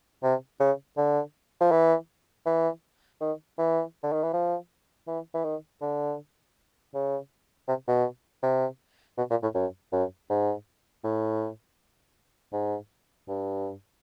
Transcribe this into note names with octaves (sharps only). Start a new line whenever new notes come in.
C3
C#3
D3
F3
E3
E3
D#3
E3
D3
D#3
E3
F3
E3
E3
D#3
D3
C#3
C3
B2
C3
B2
A#2
A2
F#2
F#2
G#2
A2
G#2
G2